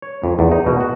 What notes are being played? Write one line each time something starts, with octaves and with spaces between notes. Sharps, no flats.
C#5
F2
E2
D#4
B2
F#4